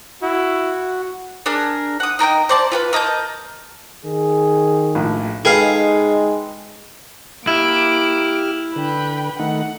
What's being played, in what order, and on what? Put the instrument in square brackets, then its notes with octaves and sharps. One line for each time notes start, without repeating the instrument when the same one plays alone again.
[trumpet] E4 [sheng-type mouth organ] F#4
[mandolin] D4 G#4 A#4
F#5 D#6
D#4 A#4 D#5 G5
C5 D5 A5
F4 G4 B4
A#4 D#5 A5 G6
[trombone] D#3 [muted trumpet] G#4
[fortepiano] A#1 A2
[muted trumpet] G#3 [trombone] D#4 [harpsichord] G#4 F5 [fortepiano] A4 B4 G5
[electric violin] A#3 D7 [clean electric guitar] E4 [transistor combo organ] G4 F6
[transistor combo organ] D3 [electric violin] B4 G5
[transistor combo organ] D#3 A3 D#4 [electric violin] F#5